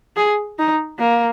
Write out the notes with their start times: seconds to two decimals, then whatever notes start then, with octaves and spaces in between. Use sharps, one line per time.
0.16 G#4
0.58 D#4
0.99 A#3